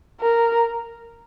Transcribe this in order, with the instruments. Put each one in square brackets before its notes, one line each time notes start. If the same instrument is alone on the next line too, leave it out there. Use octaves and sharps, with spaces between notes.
[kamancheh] A#4